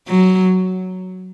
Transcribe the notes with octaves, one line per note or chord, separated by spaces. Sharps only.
F#3